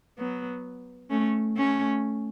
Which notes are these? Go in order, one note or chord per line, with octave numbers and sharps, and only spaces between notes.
F#3 B3
A3 C#4
A3 C#4